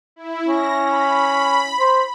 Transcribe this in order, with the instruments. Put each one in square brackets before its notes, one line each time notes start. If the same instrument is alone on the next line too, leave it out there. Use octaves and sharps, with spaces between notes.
[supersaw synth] E4
[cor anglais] C#4 [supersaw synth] A#6
[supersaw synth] B5
[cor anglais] C5